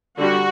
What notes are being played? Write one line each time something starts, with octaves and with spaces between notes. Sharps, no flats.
D3 G3 F#4